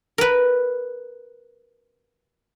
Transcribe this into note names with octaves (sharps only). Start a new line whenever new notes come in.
A#4 B4